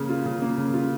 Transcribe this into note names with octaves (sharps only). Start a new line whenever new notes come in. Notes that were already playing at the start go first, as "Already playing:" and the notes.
Already playing: C#3 A#3
F4
C#3
A#3
C#3
F4